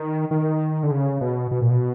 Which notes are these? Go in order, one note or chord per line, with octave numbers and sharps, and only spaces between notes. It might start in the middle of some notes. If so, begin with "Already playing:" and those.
Already playing: D#3
D#3
D3
C#3
B2
B2
A#2
B2